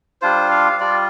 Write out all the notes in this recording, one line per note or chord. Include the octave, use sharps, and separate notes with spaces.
G3 D4 F4 C5
F5
G3 F4 D5